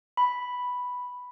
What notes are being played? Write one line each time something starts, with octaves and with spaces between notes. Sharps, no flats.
B5